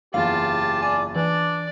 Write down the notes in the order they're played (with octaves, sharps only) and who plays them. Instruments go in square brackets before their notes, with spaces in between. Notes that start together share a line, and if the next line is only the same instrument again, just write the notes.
[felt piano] F#1 E2 [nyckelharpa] F4 A5 [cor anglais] G4 [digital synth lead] F5
[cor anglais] D5 [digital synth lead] G#5
[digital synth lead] E3 [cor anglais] D4 [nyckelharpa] D5